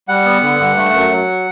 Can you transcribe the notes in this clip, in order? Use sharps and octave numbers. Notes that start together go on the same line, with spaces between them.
G3 F#5
B3
D3
G2
A3
F#2
F#3